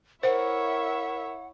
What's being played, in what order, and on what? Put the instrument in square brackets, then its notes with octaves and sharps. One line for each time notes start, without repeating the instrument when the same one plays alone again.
[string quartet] E4 C#5 E5 [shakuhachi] A#4 [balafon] C5 [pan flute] F#5